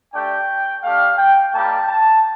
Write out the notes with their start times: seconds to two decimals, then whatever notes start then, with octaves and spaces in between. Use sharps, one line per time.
0.13 A3 D4 G4 G5
0.83 A3 D4 G4 F5
1.18 G5
1.53 G3 A#3 D#4 G4 A5
1.89 A5